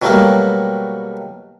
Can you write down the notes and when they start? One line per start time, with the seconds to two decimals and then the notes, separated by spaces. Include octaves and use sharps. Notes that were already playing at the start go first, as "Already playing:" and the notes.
0.02 B2 F#3 G3 A3 A#3